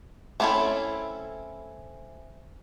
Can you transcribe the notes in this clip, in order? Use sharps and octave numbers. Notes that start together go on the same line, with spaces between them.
A3 C4 C#4 E4 A4